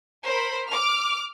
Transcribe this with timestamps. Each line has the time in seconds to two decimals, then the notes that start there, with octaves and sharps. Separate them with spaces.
0.25 A#4 C5 B5
0.69 D6 F6